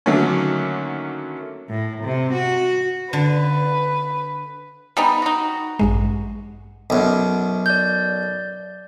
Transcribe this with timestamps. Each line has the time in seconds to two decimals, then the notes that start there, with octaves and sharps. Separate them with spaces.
0.06 D3 D#3 F#3 A3 A#3 C#4
1.69 A2
2.04 C3
2.34 F#4
3.13 D3 B4
4.97 G3 B3 D#4 G#5
5.22 D#4 F#4
5.79 A1 G2 G#3
6.90 B1 F#2
7.66 D5 G6